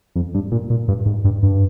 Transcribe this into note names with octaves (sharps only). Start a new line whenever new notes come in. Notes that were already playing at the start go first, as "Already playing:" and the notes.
F2
G2
A#2
A#2
G2
G#2
G2
G2